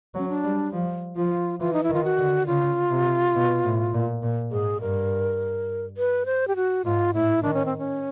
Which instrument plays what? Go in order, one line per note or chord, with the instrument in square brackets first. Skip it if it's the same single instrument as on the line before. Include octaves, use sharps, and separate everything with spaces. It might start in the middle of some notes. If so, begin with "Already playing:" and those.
[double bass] F#3
[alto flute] C#4
D4
[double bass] G3
F3
[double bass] F3 [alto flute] F4
[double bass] E3 [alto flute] F4
[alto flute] D#4
E4
[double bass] D#3
[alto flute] F4
F#4
[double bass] D3
[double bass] C#3 [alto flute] F4
[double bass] C3
B2
A2
A#2
A#2
[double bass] G#2 [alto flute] G#4
[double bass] G2 [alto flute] A#4
[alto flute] B4
C5
G4
F#4
[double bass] G#2 [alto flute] F4
[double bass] A2 [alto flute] E4
[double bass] D#3 [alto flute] D4
[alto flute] C#4
C4
C#4